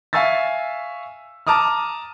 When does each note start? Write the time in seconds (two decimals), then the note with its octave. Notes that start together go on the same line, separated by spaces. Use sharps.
0.13 E5 F5 G#5 C#6 E6 A6
1.47 A5 A#5 D6 D#6 F6